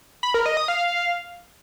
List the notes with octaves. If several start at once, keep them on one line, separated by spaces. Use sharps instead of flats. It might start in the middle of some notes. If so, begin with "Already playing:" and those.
B5
A#4
D#5
D#6
F5